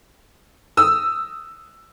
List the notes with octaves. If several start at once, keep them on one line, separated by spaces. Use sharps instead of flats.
D#6 E6